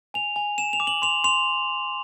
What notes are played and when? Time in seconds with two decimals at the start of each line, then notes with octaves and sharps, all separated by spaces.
0.14 G#5 F7
0.36 G#5
0.58 G#5 E7
0.73 F7
0.80 D6
0.87 F#7
1.02 C6 F7
1.24 C6 F7